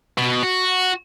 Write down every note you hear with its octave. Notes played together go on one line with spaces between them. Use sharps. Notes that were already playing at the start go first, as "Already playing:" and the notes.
B2
F#4